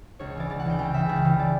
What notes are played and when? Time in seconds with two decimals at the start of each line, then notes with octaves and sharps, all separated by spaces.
0.19 C#2 C#5
0.30 C#5
0.35 C#3 E3 D5
0.50 C#2 D5
0.60 F#5
0.65 C#3 E3 G5
0.79 C#2 G5
0.94 C#3 E3 E5
1.09 C#2
1.25 C#3 E3
1.40 D5